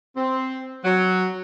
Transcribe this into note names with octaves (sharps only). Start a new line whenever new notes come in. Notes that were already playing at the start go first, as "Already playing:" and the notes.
C4
F#3